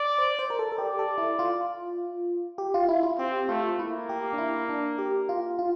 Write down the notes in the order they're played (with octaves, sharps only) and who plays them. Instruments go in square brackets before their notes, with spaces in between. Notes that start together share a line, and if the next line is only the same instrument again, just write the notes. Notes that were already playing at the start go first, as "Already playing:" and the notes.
Already playing: [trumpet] D5
[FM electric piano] C5
C5
A#4
A4
A4
[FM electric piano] G4 [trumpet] D5
[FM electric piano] A4
E4
F4
G4
F4
E4
F4
[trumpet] C4 [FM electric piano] G4
[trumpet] A3 [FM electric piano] F4
[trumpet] A#3 [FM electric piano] E4
[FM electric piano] G4
D4
E4
D4
G4
F4
F4